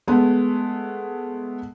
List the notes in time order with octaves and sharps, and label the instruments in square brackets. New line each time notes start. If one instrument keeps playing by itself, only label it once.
[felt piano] G#3 A3 B3